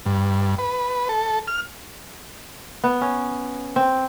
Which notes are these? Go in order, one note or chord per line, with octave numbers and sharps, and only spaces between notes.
G2
B4
A4
F6
B3
C#4
C4